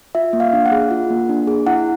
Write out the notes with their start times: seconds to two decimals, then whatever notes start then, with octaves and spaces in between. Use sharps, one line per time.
0.15 F4 E5
0.33 A#3
0.40 F5
0.53 D4
0.66 F#5
0.72 G#4
0.91 F4
1.10 A#3
1.29 D4
1.47 G#4
1.67 E4 F#5